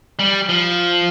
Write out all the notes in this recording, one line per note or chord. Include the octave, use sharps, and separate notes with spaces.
G3
F3